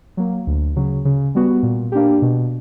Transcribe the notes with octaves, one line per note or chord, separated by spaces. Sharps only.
F#3 A#3
D2
C#3 F#3
C#3
G3 B3 F#4
A#2
A#3 D4 G4
B2